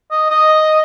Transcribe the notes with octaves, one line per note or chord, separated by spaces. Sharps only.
D#5
D#5